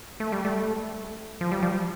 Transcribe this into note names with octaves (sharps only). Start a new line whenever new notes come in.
A3
G3
A3
F3
G3
F3